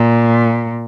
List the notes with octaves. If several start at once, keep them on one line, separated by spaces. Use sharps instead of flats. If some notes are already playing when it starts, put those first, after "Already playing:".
Already playing: A#2